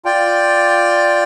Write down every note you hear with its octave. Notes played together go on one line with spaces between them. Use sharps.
F4 D5 G5